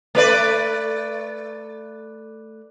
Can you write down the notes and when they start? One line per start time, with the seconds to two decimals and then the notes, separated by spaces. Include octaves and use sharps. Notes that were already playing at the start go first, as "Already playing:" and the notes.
0.15 A3 B4 D5